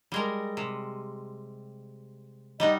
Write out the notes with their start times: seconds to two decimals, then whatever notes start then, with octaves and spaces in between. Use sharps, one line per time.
0.12 G3 G#3 A#4
0.57 C3
2.60 G3 D#4 D#5 F#5